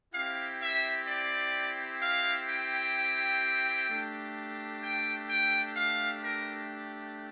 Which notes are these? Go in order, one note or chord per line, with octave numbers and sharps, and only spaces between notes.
C4 E4 G4 F5
E5
D5
F5
G5
A3 D4 G4
G5
G5
F5
A#4